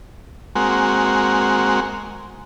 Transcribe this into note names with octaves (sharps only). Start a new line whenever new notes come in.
G#3 A#3 C4 F#4